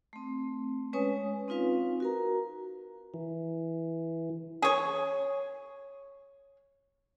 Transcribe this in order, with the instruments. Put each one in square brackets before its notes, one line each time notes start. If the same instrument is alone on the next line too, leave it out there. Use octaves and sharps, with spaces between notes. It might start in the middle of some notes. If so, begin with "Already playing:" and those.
[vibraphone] A3 C4
G#3 C#4 B4 C#5 G#5 D#6
C4 D#4 F4 B4 F5
F#4 A#4 A#5
[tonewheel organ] E3
[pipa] G#4 C#5